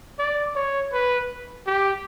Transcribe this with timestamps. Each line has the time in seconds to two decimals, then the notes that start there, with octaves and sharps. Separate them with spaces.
0.19 D5
0.55 C#5
0.92 B4
1.67 G4